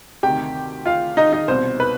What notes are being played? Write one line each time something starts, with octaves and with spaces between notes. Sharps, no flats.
D2 C3 D#3 G4 G5
F4 F5
D#4 D#5
D#4 D#5
C2 B2 C5
B4